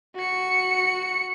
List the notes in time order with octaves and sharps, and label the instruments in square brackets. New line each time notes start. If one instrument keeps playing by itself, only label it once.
[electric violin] F#4 C#7